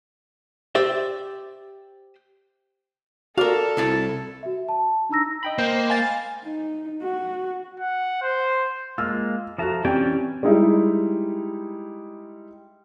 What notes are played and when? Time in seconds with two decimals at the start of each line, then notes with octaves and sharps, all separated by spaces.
0.75 G4 C5 D5 E5
3.37 F#4 A4 A#4 D5 F5
3.77 C2 E4 A5
4.43 F#4 E5
4.68 A5
5.09 D4 D#4 A#5 E6 A#6
5.43 D#5 G5 B5
5.58 A#3 C5
5.90 F5 G#5 A6
6.45 D#4
7.03 F#4
7.79 F#5
8.22 C5
8.98 G#3 A#3 F4 E6
9.58 F3 F#4 A4 E5 A5 A#5
9.85 E3 C4 C#4 G4 D5 G5 G#5
10.43 G3 G#3 D#4 E4 G4